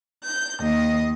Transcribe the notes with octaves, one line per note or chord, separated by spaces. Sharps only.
G6
D#2 D#5